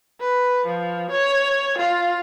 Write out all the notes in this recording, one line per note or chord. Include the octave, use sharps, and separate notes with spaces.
B4
F3
C#5
F4